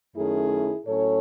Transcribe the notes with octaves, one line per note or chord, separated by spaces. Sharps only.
F#2 D#3 A3 C#4 E4 G#4
A2 F#3 C#4 A4 C#5